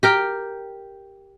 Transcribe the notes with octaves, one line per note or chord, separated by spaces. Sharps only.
G4 A#4 G5